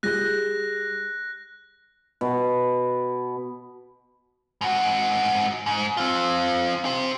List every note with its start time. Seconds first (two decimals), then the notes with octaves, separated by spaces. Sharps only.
0.03 G3 G#4 F#6 G6 A#6
2.21 B2
4.61 G#2 F#4
5.66 G#2
5.97 C4 F4
6.85 G4 C5